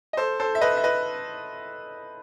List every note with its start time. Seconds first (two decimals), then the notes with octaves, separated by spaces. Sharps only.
0.13 D#5
0.17 A4 C5
0.40 A4 C5
0.55 E5
0.61 B4 D#5
0.77 E5
0.84 B4 D#5